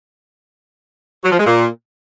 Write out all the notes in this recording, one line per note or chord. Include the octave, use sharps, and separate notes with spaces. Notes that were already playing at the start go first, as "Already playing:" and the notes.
F#3
F3
G#3
A#2